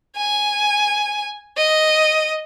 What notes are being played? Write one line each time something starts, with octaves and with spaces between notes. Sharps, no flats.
G#5
D#5